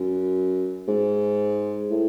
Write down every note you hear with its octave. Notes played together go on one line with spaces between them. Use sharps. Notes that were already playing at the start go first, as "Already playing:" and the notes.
Already playing: F#2
G#2
A2